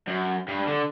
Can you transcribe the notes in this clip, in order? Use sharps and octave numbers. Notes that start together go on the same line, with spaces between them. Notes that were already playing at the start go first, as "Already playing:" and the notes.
F#2
G2
D3